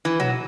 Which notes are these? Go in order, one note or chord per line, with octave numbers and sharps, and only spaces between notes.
E3
B2 F#3